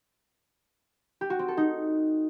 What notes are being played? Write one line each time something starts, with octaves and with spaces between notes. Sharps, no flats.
G4
F#4
C4
A4
D#4